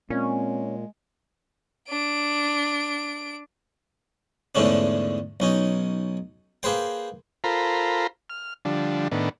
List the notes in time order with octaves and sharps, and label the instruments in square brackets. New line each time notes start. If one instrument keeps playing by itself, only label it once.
[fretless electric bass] A#2 [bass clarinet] G#3 [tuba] C4 [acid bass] C#4
[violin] D4 D7
[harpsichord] E2 G#2 D3 A3 C#4 D4
B1 C#4 D#4
A#3 G#4 B4 C5 G5
[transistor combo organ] F4 A4 A#4 C5 A#5 B5
F6
D3 F3 G3 D4
A2 D#3 B3 D4